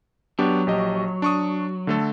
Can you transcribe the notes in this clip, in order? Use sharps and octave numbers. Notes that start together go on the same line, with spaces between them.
F#3 B3 D4 G4
A#1 G4 D#5
D4 C#6 D#6
D3 A3 A4